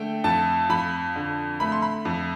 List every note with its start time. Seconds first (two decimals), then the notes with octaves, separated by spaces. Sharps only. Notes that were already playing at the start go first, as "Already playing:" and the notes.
Already playing: D3 A3 G5
0.24 F2 A5
0.69 F2 B5
1.16 D3
1.60 A3 B5
1.72 C6
1.82 B5
2.05 F2